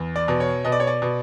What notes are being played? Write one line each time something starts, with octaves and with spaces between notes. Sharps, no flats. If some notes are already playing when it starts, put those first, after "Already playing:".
Already playing: E2
D5
B2
C#5
B2 D#5
D5
C#5
D5
B2